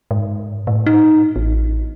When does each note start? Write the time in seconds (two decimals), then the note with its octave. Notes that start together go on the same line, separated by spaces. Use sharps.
0.11 G#2
0.67 A2
0.86 D#4
1.36 A1